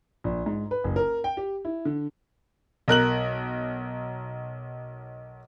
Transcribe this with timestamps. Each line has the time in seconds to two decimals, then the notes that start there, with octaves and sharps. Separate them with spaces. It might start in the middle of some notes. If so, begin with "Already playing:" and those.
0.24 A#1
0.46 G#2
0.71 B4
0.84 F#1
0.96 A#4
1.24 G5
1.37 G4
1.65 E4
1.85 D3
2.88 B1 A#4 F#6 F#7